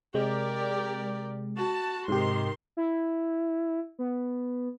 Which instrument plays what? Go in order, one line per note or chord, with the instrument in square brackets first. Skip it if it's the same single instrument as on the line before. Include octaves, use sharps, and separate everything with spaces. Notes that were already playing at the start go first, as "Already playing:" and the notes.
[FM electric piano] C3 G#3 [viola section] G4 A#4 D5
[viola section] F#4 A5
[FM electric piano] G#2 C3 G4 [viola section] D#3 C6
[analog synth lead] E4
B3